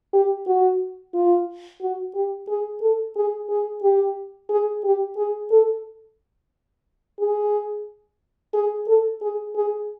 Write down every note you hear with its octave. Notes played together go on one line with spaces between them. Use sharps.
G4
F#4
F4
F#4
G4
G#4
A4
G#4
G#4
G4
G#4
G4
G#4
A4
G#4
G#4
A4
G#4
G#4